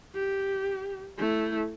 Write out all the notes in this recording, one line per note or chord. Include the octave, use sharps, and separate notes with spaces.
G4
A3 E4